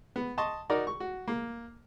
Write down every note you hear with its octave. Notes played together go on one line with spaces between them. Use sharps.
B3
D#5 A5 C6 C#6
D#4 F#4 A#4 D5
C#6
F#4
A#3